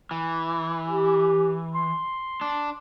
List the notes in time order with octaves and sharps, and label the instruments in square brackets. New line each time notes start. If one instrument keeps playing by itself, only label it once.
[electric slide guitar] E3
[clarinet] G4
C6
[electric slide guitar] D4